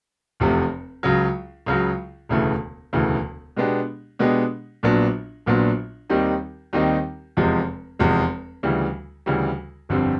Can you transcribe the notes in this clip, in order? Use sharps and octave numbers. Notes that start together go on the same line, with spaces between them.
F1 E2 C3 F3 A3
C#2 C#3 F#3
C#2 C#3 F#3
E1 D2 C#3 E3 A3
E1 D2 C#3 E3 A3
B2 G#3 B3 D4 G4
B2 G#3 B3 D4 G4
A#1 A#2 F#3 B3 D4
A#1 A#2 F#3 B3 D4
D#2 D#3 G3 C4 D#4
D#2 D#3 G3 C4 D#4
F1 E2 C3 F3 G#3
F1 E2 C3 F3 G#3
D2 C#3 E3 G3
D2 C#3 E3 G3
G1 F2 D3 G3 C4